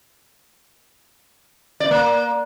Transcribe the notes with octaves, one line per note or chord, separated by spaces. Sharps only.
D5
B3
A#3